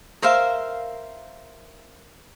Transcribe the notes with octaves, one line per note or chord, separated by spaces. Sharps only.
A#4 C5 E5 F5